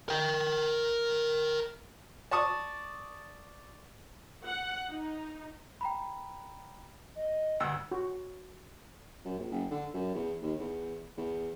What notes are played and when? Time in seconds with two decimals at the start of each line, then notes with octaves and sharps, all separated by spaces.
0.09 A#4 G5
2.31 D5 A5 C#6 D#6
4.45 F#5
4.90 D#4
5.81 G5 A#5 B5
7.16 D#5
7.60 D2 G2 E6
7.92 F#4
9.25 F#2
9.39 A#1
9.51 F#1
9.71 D3
9.94 F#2
10.15 E2
10.42 D#2
10.60 E2
11.17 E2